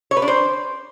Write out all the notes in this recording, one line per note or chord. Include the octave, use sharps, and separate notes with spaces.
C#5
B4
D4
C5